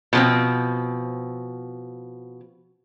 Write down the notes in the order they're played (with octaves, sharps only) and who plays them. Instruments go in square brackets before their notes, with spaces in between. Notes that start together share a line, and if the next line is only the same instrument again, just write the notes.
[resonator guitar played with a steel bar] B2 F3 C4